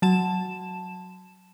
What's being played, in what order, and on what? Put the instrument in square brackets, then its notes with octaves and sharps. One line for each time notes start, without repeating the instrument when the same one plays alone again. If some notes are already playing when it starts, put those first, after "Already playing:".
[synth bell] F#3 A5 E7